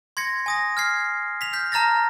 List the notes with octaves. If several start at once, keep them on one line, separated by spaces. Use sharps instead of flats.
C6 G#6 A#6 C#7
G#5 D#6 A#6
F6 G#6 C7
B6 F7
F6 G6 B6
A5 A#5 F6 A6 A#6